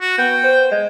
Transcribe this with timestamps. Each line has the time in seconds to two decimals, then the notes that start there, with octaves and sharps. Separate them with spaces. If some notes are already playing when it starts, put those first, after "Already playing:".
0.01 F#4
0.18 B3 G5
0.44 C5
0.71 G#3